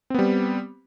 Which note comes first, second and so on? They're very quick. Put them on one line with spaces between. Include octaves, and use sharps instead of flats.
C4 B3 G3